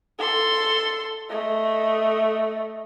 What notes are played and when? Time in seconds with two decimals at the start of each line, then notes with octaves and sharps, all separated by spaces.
0.19 A4 C6
1.29 A3 D#5